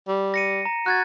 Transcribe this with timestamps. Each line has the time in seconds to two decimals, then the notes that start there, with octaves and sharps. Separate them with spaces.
0.08 G3
0.34 A#6 C#7 D#7
0.65 A#5
0.86 F#4 F#6 G#6 A6